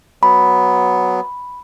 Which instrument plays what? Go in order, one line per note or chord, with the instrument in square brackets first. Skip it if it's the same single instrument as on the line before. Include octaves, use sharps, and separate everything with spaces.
[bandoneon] F#3 B3 [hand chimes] B5